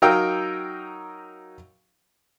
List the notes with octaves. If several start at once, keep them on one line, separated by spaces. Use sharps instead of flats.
F#3 D#4 A#4 F5 G5 E6